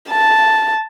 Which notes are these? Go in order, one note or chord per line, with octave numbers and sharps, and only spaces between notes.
A5